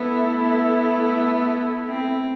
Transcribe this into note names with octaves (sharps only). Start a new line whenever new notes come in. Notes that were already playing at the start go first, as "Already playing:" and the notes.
Already playing: A3 B3 E4 A4 E5
B3
C4